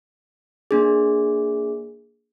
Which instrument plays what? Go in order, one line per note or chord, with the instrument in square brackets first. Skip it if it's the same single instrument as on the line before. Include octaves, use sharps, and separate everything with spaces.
[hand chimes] A#3 D4 G#4